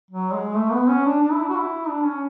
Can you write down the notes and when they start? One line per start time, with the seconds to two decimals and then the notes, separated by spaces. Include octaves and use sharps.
0.11 F#3
0.34 G#3
0.55 A3
0.72 B3
0.88 C#4
1.06 D4
1.22 D4
1.32 E4
1.42 D4
1.50 F#4
1.55 E4
1.88 D4
2.05 C#4